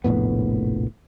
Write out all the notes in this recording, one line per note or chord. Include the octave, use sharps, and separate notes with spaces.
F1 A#1 A2 B3